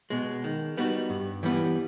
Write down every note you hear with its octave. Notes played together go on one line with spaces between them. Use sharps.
B2 G#3
D#3
G3 B3 D#4 F#4
G2
E3 G3 B3